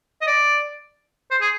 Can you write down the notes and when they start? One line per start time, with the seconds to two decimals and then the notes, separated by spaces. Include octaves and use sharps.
0.22 D#5
0.27 D5
1.31 C5
1.41 G#4